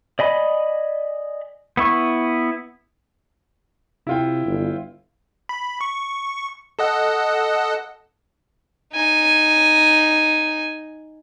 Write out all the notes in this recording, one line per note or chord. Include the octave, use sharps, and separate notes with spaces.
D5 D#5 G#5 B5
B3 E4 C#6
C3 E4 F4 G5
G1
B5
C#6
A4 D#5 F#5
D#4 G#5